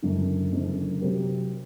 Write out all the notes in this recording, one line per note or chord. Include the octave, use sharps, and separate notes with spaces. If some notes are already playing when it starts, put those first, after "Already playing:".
F#1 F#2 D3
F#1 F#2 D3
C3 F#3 C4 G4 A#4